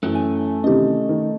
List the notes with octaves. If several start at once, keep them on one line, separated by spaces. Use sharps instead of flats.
F#2 E3 A3 C#4
G#5
C3 D#3 E3 C#4 G4 D#5
D#3